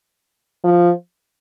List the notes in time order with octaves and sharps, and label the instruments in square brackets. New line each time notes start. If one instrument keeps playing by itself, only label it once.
[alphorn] F3